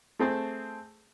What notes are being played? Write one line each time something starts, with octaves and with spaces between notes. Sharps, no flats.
A3 C4 G#4 A5